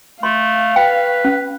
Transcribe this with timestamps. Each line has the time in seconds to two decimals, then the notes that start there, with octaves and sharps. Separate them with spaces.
0.23 A3 F5 C6
0.76 B4 G5
1.24 C#4